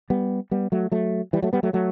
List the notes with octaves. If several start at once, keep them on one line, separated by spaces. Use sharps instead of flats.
G3 B3
G3 B3
F#3 A3
F#3 A3
E3 G3
F#3 A3
G3 B3
F#3 A3
F#3 A3